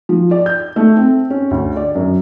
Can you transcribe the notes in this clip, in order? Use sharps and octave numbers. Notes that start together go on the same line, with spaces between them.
F3
D5
G6
A3
C4
C#4
D2
D5
F#2